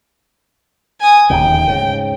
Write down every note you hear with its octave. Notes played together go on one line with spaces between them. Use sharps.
G#5 D#6
D1 D#2 C#3 G5
G#2 C#3